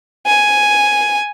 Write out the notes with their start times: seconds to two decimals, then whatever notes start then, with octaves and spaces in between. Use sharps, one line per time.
0.27 G#5